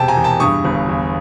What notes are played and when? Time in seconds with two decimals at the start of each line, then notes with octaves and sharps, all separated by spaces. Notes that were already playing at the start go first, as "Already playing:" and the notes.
Already playing: E1 C3 G5 A5
0.08 G#5 A#5
0.17 E2
0.24 G5 A5
0.40 G2 C#6 D#6
0.64 G1
0.89 E2